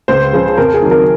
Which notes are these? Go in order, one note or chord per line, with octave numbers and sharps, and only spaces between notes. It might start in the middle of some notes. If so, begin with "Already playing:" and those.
C#2 C5
C#3 F3
F2 A#4
G#4
D#3 F#3
A#4